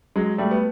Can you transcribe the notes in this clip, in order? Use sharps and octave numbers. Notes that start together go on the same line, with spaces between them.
F#3 G#3
G3 A3
B3